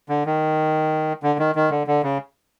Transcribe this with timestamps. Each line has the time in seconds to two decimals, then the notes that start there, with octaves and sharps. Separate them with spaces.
0.09 D3
0.26 D#3
1.23 D3
1.39 D#3
1.55 D#3
1.70 D3
1.87 D3
2.03 C#3